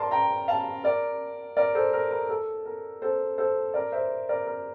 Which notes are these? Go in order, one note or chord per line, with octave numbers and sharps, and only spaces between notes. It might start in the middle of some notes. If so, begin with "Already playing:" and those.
Already playing: A#4 D5 A5 C6
G5 A#5
F5 A5
A#4 D5
A#4 D5
A4 C5
A#4
A#4
A4
A#4
A4 C5
A4 C5
A#4 D5
C5 E5
A#4 D5
A#4